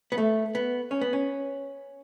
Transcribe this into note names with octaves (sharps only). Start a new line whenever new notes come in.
B3
A3
B3
C#4
B3
C#4